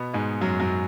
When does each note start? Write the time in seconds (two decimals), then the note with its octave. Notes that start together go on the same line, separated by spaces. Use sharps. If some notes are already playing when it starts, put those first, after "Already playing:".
Already playing: B2 B3
0.14 G#2 G#3
0.41 F#2 F#3
0.60 F#2 F#3